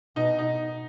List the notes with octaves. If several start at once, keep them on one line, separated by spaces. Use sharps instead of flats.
B2 D#4
D#4